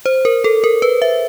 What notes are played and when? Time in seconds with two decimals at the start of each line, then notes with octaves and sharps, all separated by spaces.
0.06 C5
0.25 A#4
0.44 A4
0.64 A#4
0.82 B4
1.02 E5